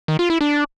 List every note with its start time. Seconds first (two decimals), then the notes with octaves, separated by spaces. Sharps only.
0.08 D#3
0.19 F4
0.30 E4
0.41 D4